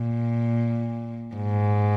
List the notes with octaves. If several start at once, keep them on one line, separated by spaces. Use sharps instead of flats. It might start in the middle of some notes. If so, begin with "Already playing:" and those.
Already playing: A#2
G#2